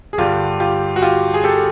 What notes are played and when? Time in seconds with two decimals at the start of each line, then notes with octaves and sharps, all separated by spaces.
0.13 G#4
0.18 G2 D3 G3 F4 G4
0.60 F4 G4
0.96 F#4
1.02 F4 G4
1.34 G#4
1.44 G4 A4